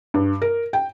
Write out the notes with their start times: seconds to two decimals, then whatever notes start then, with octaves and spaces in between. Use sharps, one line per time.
0.14 G2
0.42 A#4
0.73 G5